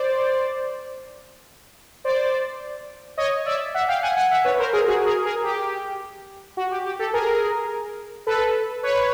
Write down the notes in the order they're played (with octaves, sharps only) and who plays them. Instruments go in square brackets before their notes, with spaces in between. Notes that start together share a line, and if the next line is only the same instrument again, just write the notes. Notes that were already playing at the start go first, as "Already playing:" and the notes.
Already playing: [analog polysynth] C5 D5
C5 D5
C#5 D#5
D5 E5
E5 F#5
F5 G5
F#5 G#5
F#5 G#5
E5 F#5
B4 C#5
A#4 C5
G#4 A#4
F#4 G#4
G#4 A#4
G#4 A#4
G4
F#4
G4
G4
G4 A4
G#4 A#4
A4 B4
B4 C#5